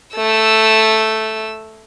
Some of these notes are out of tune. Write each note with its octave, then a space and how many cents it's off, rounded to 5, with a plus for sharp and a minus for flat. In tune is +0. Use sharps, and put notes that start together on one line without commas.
A3 +0 E6 +0